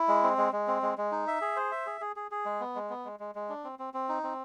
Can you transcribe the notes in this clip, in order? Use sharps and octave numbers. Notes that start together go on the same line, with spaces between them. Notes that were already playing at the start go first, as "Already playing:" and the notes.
Already playing: E4
G#3
C4
G#3
G#3
C4
G#3
G#3
D#4
E5
G#4
C5
E5
G#4
G#4
G#4
G#4
G#3
B3
G#3
B3
G#3
G#3
G#3
D4
C4
C4
C4
D#4
C4